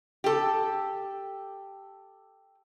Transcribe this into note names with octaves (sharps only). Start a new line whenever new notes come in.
G4 A4